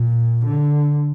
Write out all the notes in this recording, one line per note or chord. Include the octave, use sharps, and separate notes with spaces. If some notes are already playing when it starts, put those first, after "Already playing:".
Already playing: A#2
D3